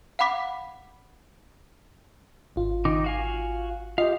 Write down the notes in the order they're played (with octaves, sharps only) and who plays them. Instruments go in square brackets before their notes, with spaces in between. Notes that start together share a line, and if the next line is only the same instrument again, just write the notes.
[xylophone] F5 F#5 B5 D6 B6
[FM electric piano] G#1 F4
[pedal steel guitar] D#3 D#4 D6
F#4 F5 G#5
[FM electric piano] F4 D#5 [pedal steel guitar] G4 F5